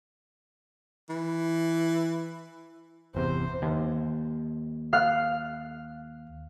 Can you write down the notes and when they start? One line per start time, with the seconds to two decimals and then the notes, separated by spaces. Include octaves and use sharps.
1.10 E3
3.15 G1 E2 C3 C5
3.62 D#2
4.93 F5 F6 F#6